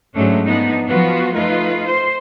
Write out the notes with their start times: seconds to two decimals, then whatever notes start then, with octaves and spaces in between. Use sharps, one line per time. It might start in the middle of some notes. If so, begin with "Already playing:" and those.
0.15 G#2 F#3 G#3 A3 C#4 D4
0.45 F3 B3 D4 D#4
0.88 F3 B3 F4 F#4 B4
1.34 A3 D#4 F4 B4
1.85 C5